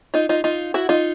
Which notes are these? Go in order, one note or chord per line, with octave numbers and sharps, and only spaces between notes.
D#4 F4
D#4 F4
D#4 F4
E4 F#4
D#4 F4